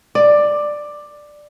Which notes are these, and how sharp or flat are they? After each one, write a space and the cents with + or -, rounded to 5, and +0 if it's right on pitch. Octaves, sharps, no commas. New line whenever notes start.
D5 +10